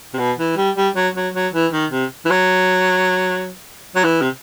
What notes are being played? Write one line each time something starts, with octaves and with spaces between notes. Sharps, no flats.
C3
B2
E3
G3
G3
F#3
F#3
F#3
E3
D#3
C3
E3
F#3
F#3
E3
C3